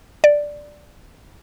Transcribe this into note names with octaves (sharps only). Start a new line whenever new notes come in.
D5